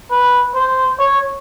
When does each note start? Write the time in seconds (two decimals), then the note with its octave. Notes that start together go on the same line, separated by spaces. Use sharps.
0.11 B4
0.55 C5
0.99 C#5